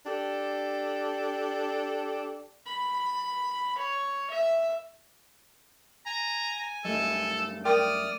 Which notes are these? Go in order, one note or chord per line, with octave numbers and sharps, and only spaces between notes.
D4 G4 A4
B5
C#5
E5
G#5 A#5
F#2 G3 A3 A4 D#5
A#4 D5 G5 C6 D#6 F6